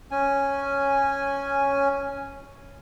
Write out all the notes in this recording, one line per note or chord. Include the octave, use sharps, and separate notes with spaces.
C#4 G#5